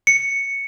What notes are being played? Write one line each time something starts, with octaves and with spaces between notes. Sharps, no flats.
C#7